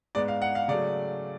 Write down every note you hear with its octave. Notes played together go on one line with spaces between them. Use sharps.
G#2 G#3 B3 D5
F5
F#5
F5
C#3 F#3 A3 D5